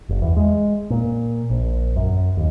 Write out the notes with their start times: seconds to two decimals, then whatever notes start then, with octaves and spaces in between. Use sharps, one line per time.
0.09 F#1
0.22 E2
0.37 G#3
0.90 A#2
1.50 A#1
1.96 F#2
2.37 D#2